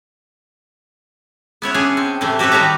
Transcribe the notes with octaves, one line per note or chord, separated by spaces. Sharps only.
B3 E4 C#5 F#5
C#4 D4 G#4
C4
A2 C3 E3 A3
F#4 G4 A4 B4 C#5
D#3 G3 F#4 D5 A#5